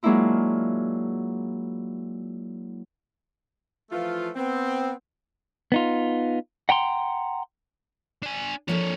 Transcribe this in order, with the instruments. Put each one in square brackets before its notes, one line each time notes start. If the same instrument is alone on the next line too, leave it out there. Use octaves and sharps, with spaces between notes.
[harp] F#3 G#3 A#3 D4 E4 F4
[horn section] E3 F3 A3 F4
B3 C4
[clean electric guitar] B3 D#4 F4
F#5 G5 A#5 C6
[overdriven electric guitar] D4 G#5
[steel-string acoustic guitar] F3 A#3 A4 [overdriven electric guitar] D4 C#5